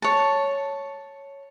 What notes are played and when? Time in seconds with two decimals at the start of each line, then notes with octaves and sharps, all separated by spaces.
0.02 C#5 A5